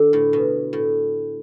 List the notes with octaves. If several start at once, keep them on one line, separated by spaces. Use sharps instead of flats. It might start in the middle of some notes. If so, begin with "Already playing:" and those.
Already playing: D3
A2
B2
A2